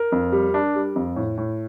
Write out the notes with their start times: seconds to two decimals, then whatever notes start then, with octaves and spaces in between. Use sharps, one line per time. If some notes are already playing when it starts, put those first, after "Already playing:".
Already playing: A#4
0.12 F2
0.32 G3
0.54 D4
0.75 G3
0.96 F2
1.16 A2
1.37 A2